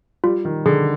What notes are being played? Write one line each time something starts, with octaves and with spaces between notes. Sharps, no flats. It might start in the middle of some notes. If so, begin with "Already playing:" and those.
G3 F4
D#3
D3 G#4